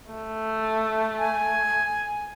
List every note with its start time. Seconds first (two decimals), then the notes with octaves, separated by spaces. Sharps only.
0.11 A3
1.19 G#5